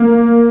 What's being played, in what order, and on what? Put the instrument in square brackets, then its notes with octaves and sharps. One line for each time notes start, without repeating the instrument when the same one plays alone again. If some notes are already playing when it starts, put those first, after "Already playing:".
Already playing: [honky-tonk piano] A#3